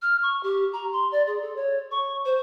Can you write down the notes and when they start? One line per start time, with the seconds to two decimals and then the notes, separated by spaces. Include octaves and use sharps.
0.02 F6
0.22 C#6
0.43 G4
0.73 A#5
0.92 C6
1.12 D5
1.27 G#4
1.42 A4
1.56 C#5
1.91 C#6
2.25 C5